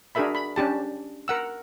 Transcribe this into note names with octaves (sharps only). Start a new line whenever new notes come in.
D4 F#4 G#4 A#4 E5 B5
B5
C#4 D4 G4 A5
A#4 F#5 E6